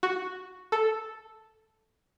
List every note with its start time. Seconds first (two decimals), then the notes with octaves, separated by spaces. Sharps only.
0.03 F#4
0.72 A4